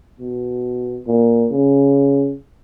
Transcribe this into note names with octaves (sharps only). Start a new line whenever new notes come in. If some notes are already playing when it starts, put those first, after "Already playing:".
B2
A#2
C#3